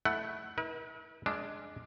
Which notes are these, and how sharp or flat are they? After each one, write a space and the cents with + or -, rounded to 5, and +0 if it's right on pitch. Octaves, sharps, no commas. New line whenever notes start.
A3 +0 E4 +0 F#5 +15
E4 -40 B4 -45
G#3 +15 D4 +0 F4 -20